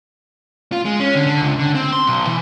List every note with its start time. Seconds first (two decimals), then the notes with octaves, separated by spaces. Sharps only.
0.72 F4
0.85 G#3
1.00 C#4
1.15 D3
1.27 D3
1.41 C#2
1.59 D3
1.75 C4
1.93 C6
2.07 B1
2.27 E3